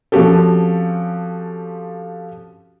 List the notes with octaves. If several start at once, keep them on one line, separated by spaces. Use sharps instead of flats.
F3 C4 C#4 F#4 G4 A4